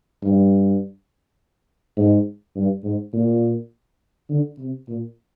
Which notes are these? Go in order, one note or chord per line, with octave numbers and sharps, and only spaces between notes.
G2
G#2
G2
G#2
A#2
D3
C3
A#2